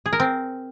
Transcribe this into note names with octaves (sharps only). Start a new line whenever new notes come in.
G#4
A#4
C4